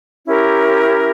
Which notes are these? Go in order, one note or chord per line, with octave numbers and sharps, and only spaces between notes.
C#4 E4 G4 A#4